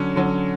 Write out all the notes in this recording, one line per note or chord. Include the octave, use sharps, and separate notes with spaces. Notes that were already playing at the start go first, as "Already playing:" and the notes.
Already playing: D3 F#3 C#4
D3 F#3 C#4